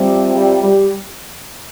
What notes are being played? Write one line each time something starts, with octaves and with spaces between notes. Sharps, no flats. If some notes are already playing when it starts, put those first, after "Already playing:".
Already playing: C3 F3 G3 C4
G3
G3